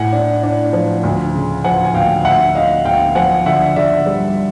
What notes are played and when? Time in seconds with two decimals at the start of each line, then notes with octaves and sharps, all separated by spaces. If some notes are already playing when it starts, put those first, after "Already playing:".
Already playing: A2 F#5 G#5
0.13 D4
0.43 D4
0.73 F3
1.04 D2
1.34 C#3
1.64 F3 F#5 G#5
1.85 G#5
1.94 D2 F5 G5
2.25 D2 E5 F#5
2.55 D2 D#5 F5
2.85 D2 F5 G5
3.15 F3 F#5 G#5
3.46 D3 E5 F#5
3.76 D3 D5 E5
4.06 G3